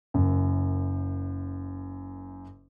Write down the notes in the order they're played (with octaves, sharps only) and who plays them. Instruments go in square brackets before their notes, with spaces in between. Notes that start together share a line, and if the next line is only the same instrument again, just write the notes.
[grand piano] F#1 F#2